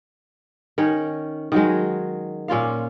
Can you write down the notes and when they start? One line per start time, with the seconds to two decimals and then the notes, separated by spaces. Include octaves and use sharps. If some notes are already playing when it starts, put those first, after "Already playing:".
0.78 D#3 C#4 C#5
1.52 D#3 F#3 G#3
2.48 A#2 C#4 F4 F5